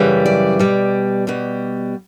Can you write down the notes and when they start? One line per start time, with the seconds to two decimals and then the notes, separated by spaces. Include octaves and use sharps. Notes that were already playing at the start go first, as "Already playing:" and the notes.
Already playing: F#2 C#3 E3 G3
0.26 D5
0.59 B2 G3
1.27 B2 G3